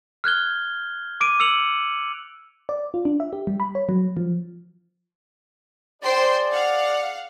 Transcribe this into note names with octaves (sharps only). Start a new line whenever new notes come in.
F6 F#6 G#6 G7
D6 D7 D#7
E6 C#7 F7 F#7
D5
F4
D4
E5
G4
G3
B5
C#5
F#3
F3
G#4 C5 D5 G5 C6
F5 F#5